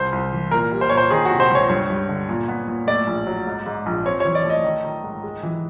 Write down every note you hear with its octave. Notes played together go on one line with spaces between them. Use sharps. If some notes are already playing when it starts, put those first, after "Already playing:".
Already playing: C2 C5
C2
E3
A#2 A#4
G3
C5
A#2 C#5
C5
D#3 G#4
F#4
C3
C5
C#2
C#5
G2 C#5
G2
D3
A#2
B3
A#2
A2 D5
A#1
F#3
G#2
G#2
A#1
C4 C#5
E3 C#5
D5
A3 D#5
D#3
D#3
G#2
G#3
E3